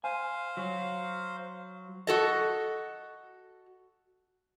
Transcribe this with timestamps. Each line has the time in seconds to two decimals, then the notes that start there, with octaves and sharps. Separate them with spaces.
0.04 C5 F5 G#5
0.57 F#3
2.07 F#4 A4 D#5